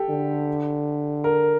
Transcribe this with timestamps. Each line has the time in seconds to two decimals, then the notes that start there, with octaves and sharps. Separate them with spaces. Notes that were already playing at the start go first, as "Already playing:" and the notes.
Already playing: G4 A4
0.09 D3
1.24 A#4